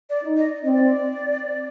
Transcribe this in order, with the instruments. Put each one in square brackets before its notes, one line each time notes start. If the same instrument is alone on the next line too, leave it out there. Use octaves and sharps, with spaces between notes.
[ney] D5
[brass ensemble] D#4
[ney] D#5
[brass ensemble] C4 [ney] D5 D#5